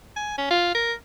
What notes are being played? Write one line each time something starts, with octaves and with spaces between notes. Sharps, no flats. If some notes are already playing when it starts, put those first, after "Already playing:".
G#5
C#4
F4
A#4